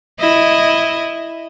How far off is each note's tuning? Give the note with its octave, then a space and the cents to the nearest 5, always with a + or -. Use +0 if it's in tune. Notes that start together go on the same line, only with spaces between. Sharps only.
E4 +0 D#5 -5